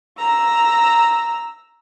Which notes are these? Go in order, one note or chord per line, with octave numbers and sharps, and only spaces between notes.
A#5 E6